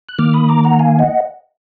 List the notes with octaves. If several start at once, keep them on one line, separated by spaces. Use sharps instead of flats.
F#6
D#3 A#3 D6 F6
B5 D#6
A#5 D6
F#5 A#5
F5 G#5
D#5 F#5